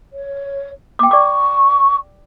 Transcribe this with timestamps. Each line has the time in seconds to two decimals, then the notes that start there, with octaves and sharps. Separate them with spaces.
0.12 C#5
0.99 A#3 G5 D6
1.11 D5 C#6 D6